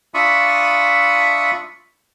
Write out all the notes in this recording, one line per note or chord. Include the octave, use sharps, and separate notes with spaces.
D4 F4 E5 B5 C#6 D#6